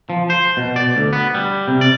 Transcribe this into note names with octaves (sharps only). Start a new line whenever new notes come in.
F3
C5
B2
D5
D2
B3
G3
C3
D5